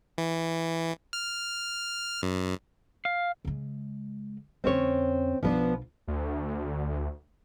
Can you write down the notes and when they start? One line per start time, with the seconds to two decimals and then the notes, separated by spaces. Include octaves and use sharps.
0.18 E3
1.13 F6
2.23 F#2
3.05 F5
3.45 C#3 G#3
4.64 F2 D3 C4 C#4 C#5
5.43 B1 F3 B3 D4 F4
6.08 D2